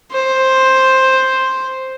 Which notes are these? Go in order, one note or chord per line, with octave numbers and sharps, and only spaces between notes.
C5